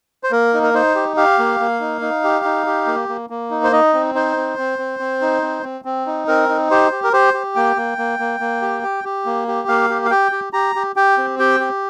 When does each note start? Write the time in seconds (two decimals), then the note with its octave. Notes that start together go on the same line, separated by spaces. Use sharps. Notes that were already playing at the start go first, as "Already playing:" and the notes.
0.23 C5
0.31 A#3 A#4
0.54 D#4
0.63 A#4
0.74 D#4 C5
0.95 G4
1.17 G4 F5
1.38 A#3
1.60 A#3
1.80 D#4
2.01 D#4
2.24 G4
2.45 D#4
2.66 G4
2.87 A#3
3.09 A#3
3.30 A#3
3.51 D#4
3.64 C5
3.72 D#4 D#5
3.94 C4
4.15 D#4 C5
4.37 C4
4.58 C4
4.79 C4
4.99 C4
5.21 D#4
5.42 C4
5.63 C4
5.85 C4
6.06 D#4
6.28 C4 A#4
6.49 D#4
6.70 G4 C5
6.92 G4
7.04 A#4
7.13 G4 C5
7.34 G4
7.56 A#3 G5
7.76 A#3
7.98 A#3
8.19 A#3
8.40 A#3
8.62 G4
8.83 G4
9.04 G4
9.26 A#3
9.48 G4
9.68 A#3 F5
9.90 G4
10.05 F5
10.10 G4 G5
10.32 G4
10.53 G4 A#5
10.76 G4
10.96 G4 G5
11.18 C4
11.39 G4 G5
11.60 G4